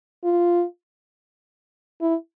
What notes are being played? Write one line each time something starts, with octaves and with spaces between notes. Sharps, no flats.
F4
E4